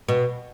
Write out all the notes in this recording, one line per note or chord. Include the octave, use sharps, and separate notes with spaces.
B2